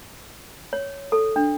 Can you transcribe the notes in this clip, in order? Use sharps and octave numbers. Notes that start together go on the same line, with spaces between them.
C#5
A4
D4